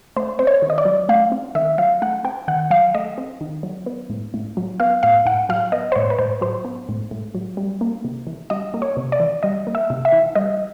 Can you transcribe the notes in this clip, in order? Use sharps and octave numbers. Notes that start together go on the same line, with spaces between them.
A3 C5
C4 C5
C#5
D#3
D#5
D5
F#3
A3 F5
C4
D#3 E5
F#3 F5
A3 F#5
C4 G5
D#3 F#5
F#3 F5
A3 D#5
C4
D#3
F#3
B3
A2
A2
F#3
B3 F5
A2 F5
A2 F#5
F#3 F5
B3 D#5
C5
A2 C#5
B4
A2 C5
F#3 C5
B3
A2
A2
F#3
G3
A#3
C3
E3
G3 D#5
A#3
C#5
C3
D5
E3
G3 D#5
A#3
E5
C3
E5
E3
G3 D#5